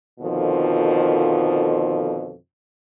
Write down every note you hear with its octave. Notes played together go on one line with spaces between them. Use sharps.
F2 B2 D3 D#3 F3